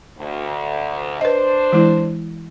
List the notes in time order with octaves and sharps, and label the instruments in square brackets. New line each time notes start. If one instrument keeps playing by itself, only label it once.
[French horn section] D2
[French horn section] D4 C5 [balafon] B4 D#5
[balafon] E3 G#3 E4